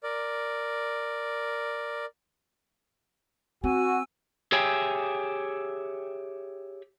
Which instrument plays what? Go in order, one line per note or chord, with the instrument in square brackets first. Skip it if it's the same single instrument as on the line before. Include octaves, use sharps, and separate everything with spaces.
[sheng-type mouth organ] A#4 D5
[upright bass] C4 [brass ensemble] F#4 [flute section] G#5 E6
[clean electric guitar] G4 G#4 C#5 E5 G5 G#5